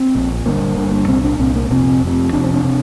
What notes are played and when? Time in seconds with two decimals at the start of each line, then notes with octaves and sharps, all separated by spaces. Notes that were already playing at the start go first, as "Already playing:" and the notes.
Already playing: C4
0.15 A#1 A#2
0.46 G1 G2 D3 A#3
0.77 G1 G2 D3
1.08 C2 A#2 C4
1.24 D4
1.39 C2 A#2 C4
1.55 A#3
1.70 F1 F2 C3 C4
2.02 F1 F2 C3
2.33 F1 F2 C3 D4
2.44 C4
2.54 D4
2.64 C3